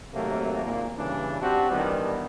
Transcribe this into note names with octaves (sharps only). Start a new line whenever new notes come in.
D#2 C3 F#3 A3 A#3
G#1 A#2 A#3
G2 C#3 E3 D4
C4 D4 F#4 G4
D#3 E3 G3 B3 D4